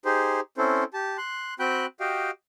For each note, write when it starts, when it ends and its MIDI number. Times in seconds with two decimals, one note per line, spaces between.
0.05 0.40 63
0.05 0.40 67
0.05 0.40 68
0.05 0.40 72
0.58 0.84 60
0.58 0.84 61
0.58 0.84 64
0.58 0.84 69
0.58 0.84 72
0.94 1.17 67
0.94 1.17 81
1.18 1.54 84
1.18 1.54 90
1.59 1.86 60
1.59 1.86 66
1.59 1.86 79
1.59 1.86 83
1.59 1.86 90
1.59 1.86 91
2.00 2.31 66
2.00 2.31 67
2.00 2.31 75
2.00 2.31 77
2.00 2.31 79